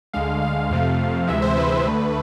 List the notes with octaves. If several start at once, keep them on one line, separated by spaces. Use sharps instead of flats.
D2 D3 G#3 F5
F5
F2 C3 F3 A3 F5
D2 C3 E3 G#3 E5
C5
B4
D2 D3 A3